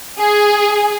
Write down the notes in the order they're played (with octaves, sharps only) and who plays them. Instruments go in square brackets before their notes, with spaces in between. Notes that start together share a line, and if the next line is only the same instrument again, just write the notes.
[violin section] G#4